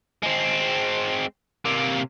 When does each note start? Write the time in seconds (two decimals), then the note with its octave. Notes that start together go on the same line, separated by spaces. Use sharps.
0.23 G#3 C4
1.65 C3 A#3